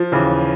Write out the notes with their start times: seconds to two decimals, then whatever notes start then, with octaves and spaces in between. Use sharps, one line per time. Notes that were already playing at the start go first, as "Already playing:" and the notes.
Already playing: F3
0.12 D#2 C#3 E3